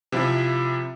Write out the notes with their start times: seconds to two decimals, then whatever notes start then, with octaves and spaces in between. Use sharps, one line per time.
0.12 C3 F3 E4 E5